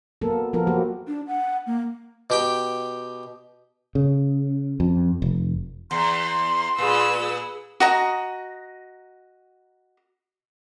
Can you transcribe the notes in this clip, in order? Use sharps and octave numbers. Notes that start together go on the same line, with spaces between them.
F#3 A#3 B3 A4 A#4
F3 A#3 B3 F4 A4 A#4
F#3 A#3 F#4 G4
D4
F#5
A#3
B2 G4 G5
C#3
F2
F1
E2 C6
A#2 G#4 B4 E6
F#4 D#5 A#5